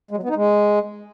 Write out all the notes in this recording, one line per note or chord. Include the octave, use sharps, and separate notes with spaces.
G#3
F#3
B3
D#4
G#3